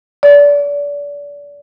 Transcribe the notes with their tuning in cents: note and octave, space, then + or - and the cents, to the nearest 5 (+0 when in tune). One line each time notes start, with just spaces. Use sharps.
D5 -30